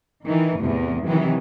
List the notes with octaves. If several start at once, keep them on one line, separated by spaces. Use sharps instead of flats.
D#3 E3
E2 A2 C3
C3 D#3 E3 F#3